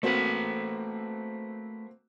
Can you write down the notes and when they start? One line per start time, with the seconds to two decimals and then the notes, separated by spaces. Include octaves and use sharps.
0.03 A3 A#3 C4 F#4 B4